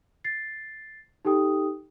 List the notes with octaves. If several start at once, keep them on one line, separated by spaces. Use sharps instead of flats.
A6 C7
D#4 G4 A4 G5 D#6